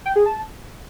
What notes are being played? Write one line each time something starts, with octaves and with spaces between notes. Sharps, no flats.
G5
G#4
A5